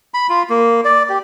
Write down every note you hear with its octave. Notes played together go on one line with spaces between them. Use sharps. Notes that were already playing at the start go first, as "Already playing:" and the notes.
B5
F4
A#3
D5
G4